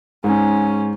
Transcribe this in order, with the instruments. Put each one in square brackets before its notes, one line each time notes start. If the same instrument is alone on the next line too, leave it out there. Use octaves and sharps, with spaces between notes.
[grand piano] G#2 [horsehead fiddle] C#4